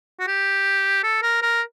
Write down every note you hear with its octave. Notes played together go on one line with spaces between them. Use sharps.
F#4
G4
A4
A#4
A#4